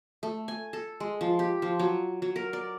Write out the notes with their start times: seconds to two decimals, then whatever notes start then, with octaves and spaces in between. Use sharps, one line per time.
0.23 A3
0.48 G#5
0.73 A4
1.00 G#3
1.21 F3
1.39 G4
1.62 F3
1.79 F#3
2.22 F#3
2.36 A#4
2.53 D5